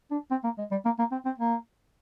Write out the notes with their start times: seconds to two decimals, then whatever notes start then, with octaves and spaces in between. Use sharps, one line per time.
0.11 D4
0.31 C4
0.44 A#3
0.58 G#3
0.71 G3
0.85 A#3
0.99 A#3
1.12 C4
1.25 C4
1.38 A#3